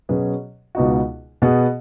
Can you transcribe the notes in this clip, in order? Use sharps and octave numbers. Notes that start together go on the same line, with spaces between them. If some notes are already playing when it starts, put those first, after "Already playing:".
B2 F#3 C#4 G#4 B4
C#2 B2 B3 D#4 F#4
B2 B3 G#4